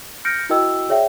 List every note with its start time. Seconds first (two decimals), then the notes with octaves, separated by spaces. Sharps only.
0.25 F6 G6 A#6 C#7 D7
0.50 E4 F#4 A#4 D#5 G5 E6
0.89 G#4 C#5 D5 E5 G5